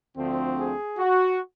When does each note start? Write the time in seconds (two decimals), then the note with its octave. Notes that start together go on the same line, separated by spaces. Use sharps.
0.16 D2 D3 F3 A3 C4
0.58 G#4
0.98 F#4